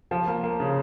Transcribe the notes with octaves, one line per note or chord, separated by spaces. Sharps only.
F3
A#3
A#3
C#3